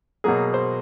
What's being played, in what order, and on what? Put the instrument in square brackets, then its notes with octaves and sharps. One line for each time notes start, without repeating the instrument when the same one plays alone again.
[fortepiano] B2 F#3 A#3 G#4
C5